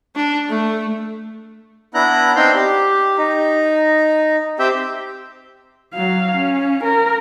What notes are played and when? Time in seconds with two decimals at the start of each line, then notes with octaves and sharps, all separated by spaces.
0.16 D4
0.49 A3
1.94 B3 D4 E4 A#5 F#6
2.36 C4 D4 D#4 F5 G5 C6
2.55 G4
3.18 D#4
4.59 C4 G4 E5 G5
5.94 F#3 F5
6.36 C#4
6.84 A#4